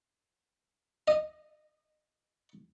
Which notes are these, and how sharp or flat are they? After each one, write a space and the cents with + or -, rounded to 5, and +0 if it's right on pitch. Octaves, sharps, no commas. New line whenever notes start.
D#5 -10